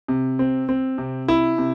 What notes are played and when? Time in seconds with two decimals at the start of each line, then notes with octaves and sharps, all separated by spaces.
0.08 C3
0.39 C4
0.69 C4
0.98 C3
1.28 E4
1.58 C3